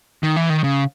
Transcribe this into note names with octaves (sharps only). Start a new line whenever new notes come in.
D#3
E3
D#3
C#3